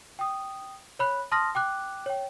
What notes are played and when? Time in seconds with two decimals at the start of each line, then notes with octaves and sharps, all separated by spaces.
0.19 G5 D#6
0.99 C#5 B5 F#6
1.32 A5 C6 D#6 F6 A#6
1.55 G5 D6 F#6
2.06 C#5 G5